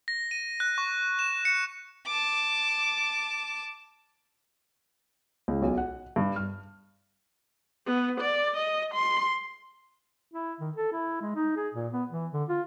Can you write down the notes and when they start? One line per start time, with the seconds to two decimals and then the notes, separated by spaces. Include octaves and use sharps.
0.08 A#6
0.31 D#7
0.60 F#6
0.78 C#6
1.19 E7
1.45 C#7
2.06 A5 D6
5.48 C#2
5.62 B1
5.77 F#5
6.16 G2
6.36 F6
7.86 B3
8.20 D5
8.56 D#5
8.94 C6
10.34 E4
10.60 D#3
10.76 A4
10.92 E4
11.21 G#3
11.36 D#4
11.56 G#4
11.74 A#2
11.93 B3
12.11 E3
12.33 D3
12.49 F4